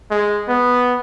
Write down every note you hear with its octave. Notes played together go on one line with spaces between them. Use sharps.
G#3
B3